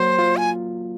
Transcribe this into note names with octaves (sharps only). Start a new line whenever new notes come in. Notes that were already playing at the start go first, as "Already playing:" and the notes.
Already playing: F#3 A#3 C5
F4
G#5